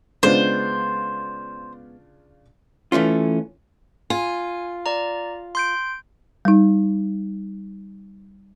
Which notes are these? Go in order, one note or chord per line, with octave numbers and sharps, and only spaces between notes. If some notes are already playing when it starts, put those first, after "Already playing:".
C#3 G#3 B3 D4 F4 C5
E3 A3 C#4 F4
F4 G#5
D5 A#5
C6 G6 D7
G3 D#4